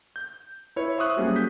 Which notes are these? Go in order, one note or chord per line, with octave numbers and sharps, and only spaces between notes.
G6
E4 B4 C#5 E5
C5 E5 C#6 D#6 F#6
F#3 G3 A#3 C#4 F#4 G#4
G6 B6